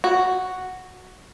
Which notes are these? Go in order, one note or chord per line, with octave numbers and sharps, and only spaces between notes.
F#4